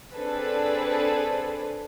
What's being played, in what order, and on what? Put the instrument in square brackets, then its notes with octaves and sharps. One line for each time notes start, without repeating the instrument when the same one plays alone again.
[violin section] C4 D4 G#4 A4 B4 C5